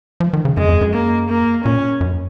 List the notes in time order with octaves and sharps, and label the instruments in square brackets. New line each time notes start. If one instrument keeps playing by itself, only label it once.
[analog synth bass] F3
D#3
C#3
[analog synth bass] F#2 [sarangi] G#3
[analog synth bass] F2
F#2
[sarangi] A#3
A#3
[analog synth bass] A#2 [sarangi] C#4
[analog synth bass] F#2